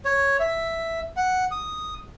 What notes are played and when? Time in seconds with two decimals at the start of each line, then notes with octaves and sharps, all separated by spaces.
0.05 C#5
0.40 E5
1.17 F#5
1.51 D#6